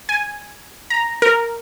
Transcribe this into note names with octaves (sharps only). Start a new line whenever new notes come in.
G#5
A#5
A#4